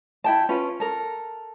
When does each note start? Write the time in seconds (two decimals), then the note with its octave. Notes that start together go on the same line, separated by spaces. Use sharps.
0.24 E4 G5 A5
0.49 C#4 F4 B4
0.80 A4 A#4